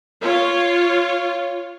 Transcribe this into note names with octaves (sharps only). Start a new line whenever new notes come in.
F4 C#5